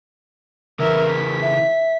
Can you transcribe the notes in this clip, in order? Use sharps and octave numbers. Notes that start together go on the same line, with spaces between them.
C#3 E3 A#4 E5
B6
E5